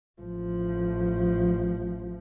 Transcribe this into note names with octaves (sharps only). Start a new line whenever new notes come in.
A1 F3